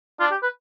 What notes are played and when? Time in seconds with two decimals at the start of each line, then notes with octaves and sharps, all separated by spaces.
0.20 D4 F4
0.31 G4
0.43 B4